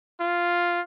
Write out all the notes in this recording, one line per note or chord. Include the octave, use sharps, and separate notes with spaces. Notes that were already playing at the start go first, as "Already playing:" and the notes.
F4